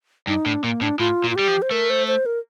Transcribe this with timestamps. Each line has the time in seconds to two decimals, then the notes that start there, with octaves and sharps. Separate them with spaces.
0.27 G2 D#4
0.46 A2 D4
0.63 A#2 A#3
0.81 A2 D4
0.99 A2 F4
1.24 A#2
1.31 F4
1.36 G3 G4
1.48 F3
1.62 C5
1.71 A3 A#4
1.90 C5
2.08 C5
2.26 A#4